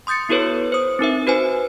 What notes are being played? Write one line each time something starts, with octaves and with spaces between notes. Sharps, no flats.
C6 D#6 G6 A6 C#7
B3 E4 F#4 A4 B4 C#5
C5 D#6
C4 D#4 A#4 E5
F#4 B4 C5 G#5